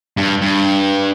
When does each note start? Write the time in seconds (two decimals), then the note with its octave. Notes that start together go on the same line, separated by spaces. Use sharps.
0.17 G2
0.42 G2